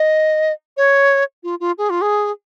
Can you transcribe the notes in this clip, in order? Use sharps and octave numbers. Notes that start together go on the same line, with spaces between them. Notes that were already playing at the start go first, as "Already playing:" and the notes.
Already playing: D#5
C#5
F4
F4
G#4
F4
G#4